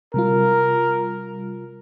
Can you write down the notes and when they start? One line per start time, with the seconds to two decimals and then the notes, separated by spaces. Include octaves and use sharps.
0.14 C3 G3 F4 A#4